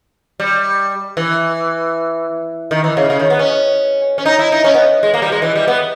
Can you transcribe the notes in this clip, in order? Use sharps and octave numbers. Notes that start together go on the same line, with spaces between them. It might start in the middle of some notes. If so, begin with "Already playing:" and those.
G3
E3
D#3
E3
C#3
C#3
D#3
B3
C#4
C#4
D#4
E4
D#4
C#4
B3
G#3
A#3
G3
G#3
E3
G3
B3